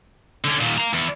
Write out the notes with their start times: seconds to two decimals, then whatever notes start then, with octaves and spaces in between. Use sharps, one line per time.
0.44 D3 C#4
0.61 D#2 A#2
0.78 F5 A#5
0.93 E2